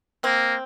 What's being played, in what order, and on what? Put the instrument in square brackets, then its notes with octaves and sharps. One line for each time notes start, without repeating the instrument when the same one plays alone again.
[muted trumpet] A#3 [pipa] C4